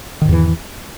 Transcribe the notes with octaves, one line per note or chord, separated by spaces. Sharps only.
E2 G#2 D#3 E3